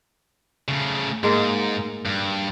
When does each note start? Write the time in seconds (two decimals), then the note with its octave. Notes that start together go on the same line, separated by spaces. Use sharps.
0.68 C#3 A3
1.24 G#2 G#3 A#3
2.06 G2